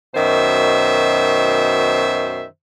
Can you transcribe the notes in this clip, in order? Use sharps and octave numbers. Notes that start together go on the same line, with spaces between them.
F#2 B2 D#3 C5 E5